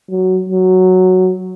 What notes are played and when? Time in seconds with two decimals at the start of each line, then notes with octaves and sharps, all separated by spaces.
0.10 F#3
0.49 F#3